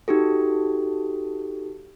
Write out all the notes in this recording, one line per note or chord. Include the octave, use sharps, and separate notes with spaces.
D#4 F#4 G4 A4